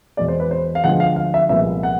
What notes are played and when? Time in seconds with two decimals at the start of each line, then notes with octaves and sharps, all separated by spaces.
0.17 E2 B2 G#3 D5
0.28 C5
0.40 B4
0.51 C5
0.75 F5
0.84 D2 D3 F3 G#3 B3 F#5
1.00 F5
1.16 F5
1.34 E5
1.49 C2 A#2 F3 G#3 B3 E5
1.83 F#5